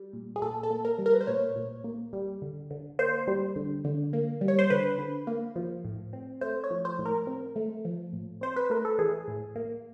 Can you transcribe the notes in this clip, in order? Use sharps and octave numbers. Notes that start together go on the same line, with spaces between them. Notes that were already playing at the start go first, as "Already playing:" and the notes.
Already playing: G3
A#2
G#4
A#2 A4
A4
A#3
A#4
G3
A#4
B4
C5
A#2 C#5
A#2
A#3
G3
D3
D3
A#3 C5
G3
D3
D3
A#3
G3
C#5
C5
D3 B4
D3
A#3
F3
A2
C4
A3 C5
C#5
F3
C5
A2
A#4
C4
A3
F3
A2
C4 C5
B4
A3 A#4
A4
E3 G#4
A2
A#3